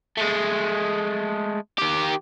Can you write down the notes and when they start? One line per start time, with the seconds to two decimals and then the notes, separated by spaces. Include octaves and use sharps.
0.17 G#3 A3
1.78 D#3 G4